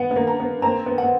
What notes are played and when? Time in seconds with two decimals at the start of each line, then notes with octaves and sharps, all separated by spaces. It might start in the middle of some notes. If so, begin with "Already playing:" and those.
Already playing: B3 F#5
0.11 B3
0.16 A#3
0.27 A#5
0.40 B3
0.62 A#3 C4 A#5
0.86 B3
0.98 F#5
1.03 B3